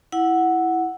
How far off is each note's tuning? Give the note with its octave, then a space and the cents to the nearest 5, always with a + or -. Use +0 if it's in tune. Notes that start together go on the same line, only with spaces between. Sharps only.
E4 +0 F#5 +0